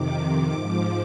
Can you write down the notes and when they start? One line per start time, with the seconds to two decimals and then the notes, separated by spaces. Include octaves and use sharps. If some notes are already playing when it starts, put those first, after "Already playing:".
Already playing: F2 C3 D#3 D6
0.48 G#2 F3 D6